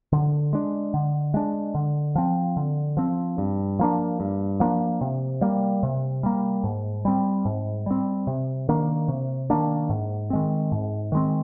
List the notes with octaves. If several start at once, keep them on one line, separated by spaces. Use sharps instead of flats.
D3
G#3 D4
D3
G#3 D4
D3
F3 C4
D3
F3 C4
G2
F3 A#3 D4
G2
F3 A#3 D4
C3
G3 A#3
C3
G3 A#3
G#2
G3 C4
G#2
G3 C4
C3
D#3 A#3 D4
C3
D#3 A#3 D4
G#2
D#3 G#3 C4
G#2
D#3 G#3 C4